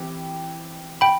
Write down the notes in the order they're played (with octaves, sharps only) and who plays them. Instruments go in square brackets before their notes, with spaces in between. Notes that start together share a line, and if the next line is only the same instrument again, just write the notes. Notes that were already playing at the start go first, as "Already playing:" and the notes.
Already playing: [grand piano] E3 C4 G4
[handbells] G5 B5